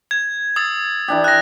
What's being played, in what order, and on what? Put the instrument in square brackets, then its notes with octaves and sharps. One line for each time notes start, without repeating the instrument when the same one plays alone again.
[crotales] G#6
D#6 E6 A6
[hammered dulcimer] E3 D4 G4
[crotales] F#6 A#6